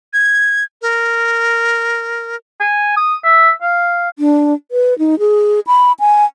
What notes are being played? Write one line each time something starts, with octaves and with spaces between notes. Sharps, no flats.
G#6
A#4
G#5
D#6
E5
F5
D4
B4
D#4
G#4
B5
G#5